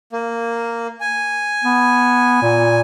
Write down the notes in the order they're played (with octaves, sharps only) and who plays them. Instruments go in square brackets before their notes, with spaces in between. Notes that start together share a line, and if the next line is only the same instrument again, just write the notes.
[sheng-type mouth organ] A#3
G#5
[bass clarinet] B3
A#2